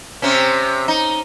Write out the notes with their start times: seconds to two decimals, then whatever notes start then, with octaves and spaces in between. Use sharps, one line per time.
0.22 C3 C4 C#4
0.88 D#4